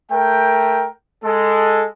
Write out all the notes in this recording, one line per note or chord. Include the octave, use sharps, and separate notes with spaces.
A3 A#4 G5
G#3 A4